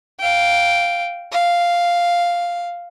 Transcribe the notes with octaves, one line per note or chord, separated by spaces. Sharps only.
F5 G5
F5